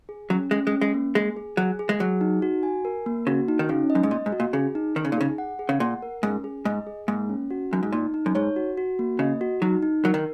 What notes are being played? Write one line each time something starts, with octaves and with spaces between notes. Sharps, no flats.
G#4
F#3 C#4
G#3 C#4
G#3
C#4
G#3
A#3
G#3 G#4
G#4
F#3 G#4
G#4
G#3
F#3 G#4
D#4
F#4
G#5
A#4
A#3
C#3 F#4
D#4
D#3
C#3 C#4
D#5
F#2
G#2
A#2 D#5
G#2
F#4
A#2
C#3 G#4
D#4
D#3 D#4
C#3
A#2
C#3 G#4
F#5
G#4
C#3
A#2 F#5
A#4
G#2 C#4
G#4
G#2 D#5
G#4
G#2 A#3
C#4
F#4
F#2 D#4
G#2
A#2 D#4
D#4
F#2
G#2 C#5
F#4
F#4
A#3
C#3 D#5
F#4
F#3 D#4
D#4
F#3 A#4
D#3